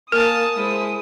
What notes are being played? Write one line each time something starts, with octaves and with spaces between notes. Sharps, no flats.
A#3 A#4 G#5 A5 D#6
G#3 E4 C5